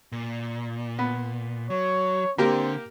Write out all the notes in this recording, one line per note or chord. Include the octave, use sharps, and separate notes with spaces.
A#2
B3
F#3 C#5
D3 A#3 C4 G4 A#4